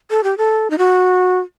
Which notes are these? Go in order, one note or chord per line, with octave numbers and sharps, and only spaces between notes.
A4
G4
A4
D#4
F#4